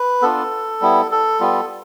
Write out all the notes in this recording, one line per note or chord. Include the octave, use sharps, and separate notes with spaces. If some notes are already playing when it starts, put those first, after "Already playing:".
Already playing: B4
B3 D4 F4 A4
G3 B3 E4
A4
G3 B3 F4